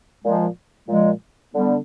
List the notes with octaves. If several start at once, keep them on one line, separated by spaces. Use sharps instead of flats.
A#2 F3 G#3
A#2 F3 G#3
D3 G3 B3